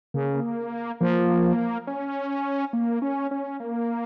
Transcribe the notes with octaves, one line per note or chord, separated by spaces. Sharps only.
C#3 A#3
F3 A#3
C#4
A#3
C#4
C#4
A#3